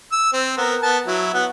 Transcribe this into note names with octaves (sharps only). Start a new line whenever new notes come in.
E6
C4
B3 A#4
B3 A5
F#3 E4
B3 F#5